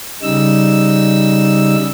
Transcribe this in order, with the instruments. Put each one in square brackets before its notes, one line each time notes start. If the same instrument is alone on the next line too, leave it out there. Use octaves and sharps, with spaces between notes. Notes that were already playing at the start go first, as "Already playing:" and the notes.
[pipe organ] C#3 G3 D#4 E6